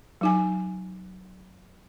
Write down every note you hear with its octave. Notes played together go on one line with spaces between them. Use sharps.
F#3 D#4 G#5